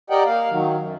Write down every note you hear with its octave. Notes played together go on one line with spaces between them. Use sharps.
G4 A#4 D5 D#5 F#5 G5
A#3 F5
D#3 F#3
F#2